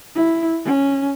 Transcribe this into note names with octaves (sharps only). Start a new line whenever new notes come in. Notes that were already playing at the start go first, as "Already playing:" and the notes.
E4
C#4